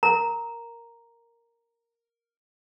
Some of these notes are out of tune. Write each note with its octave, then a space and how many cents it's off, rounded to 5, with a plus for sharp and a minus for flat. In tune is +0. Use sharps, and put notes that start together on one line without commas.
A#4 +0 A#5 +0